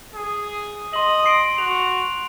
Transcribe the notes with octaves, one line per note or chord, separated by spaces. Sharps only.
G#4
D#5 C6 F#7
C6 C7 D7
F#4 F7